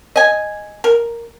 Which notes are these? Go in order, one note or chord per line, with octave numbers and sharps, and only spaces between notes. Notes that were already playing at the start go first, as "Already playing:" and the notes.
D#5 G#5
A#4